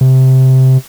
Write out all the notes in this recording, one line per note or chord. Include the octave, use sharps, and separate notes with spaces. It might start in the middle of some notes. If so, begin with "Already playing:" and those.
C3